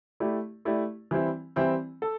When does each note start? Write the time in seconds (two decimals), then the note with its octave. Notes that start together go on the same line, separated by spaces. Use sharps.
0.20 A3 E4 G4 D5
0.65 A3 E4 G4 D5
1.11 E3 G3 C4 E4
1.56 E3 G3 C4 E4
2.02 A4